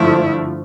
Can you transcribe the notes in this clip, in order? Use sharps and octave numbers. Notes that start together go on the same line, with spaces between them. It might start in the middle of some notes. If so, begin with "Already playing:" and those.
Already playing: G2 D3 F3 A3 E4